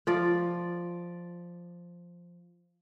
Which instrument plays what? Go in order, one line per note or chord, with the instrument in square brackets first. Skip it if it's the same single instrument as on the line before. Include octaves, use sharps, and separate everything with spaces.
[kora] F3 D5